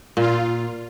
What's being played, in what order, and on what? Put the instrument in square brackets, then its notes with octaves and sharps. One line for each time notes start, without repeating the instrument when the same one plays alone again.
[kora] A#2 [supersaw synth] F4